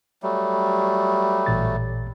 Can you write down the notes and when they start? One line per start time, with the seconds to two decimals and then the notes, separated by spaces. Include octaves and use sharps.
0.23 F#3 G3 A3
1.46 A1 A#2 A6